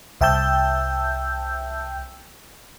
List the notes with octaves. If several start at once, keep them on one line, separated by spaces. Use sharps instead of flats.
C2 E5 G5 A5 E6 G6